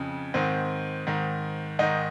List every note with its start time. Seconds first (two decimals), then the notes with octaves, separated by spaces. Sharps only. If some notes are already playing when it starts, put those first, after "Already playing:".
Already playing: F2 C#3
0.34 G#2 D#3 C4
1.07 G#2 D#3
1.79 G#2 D#3 D#4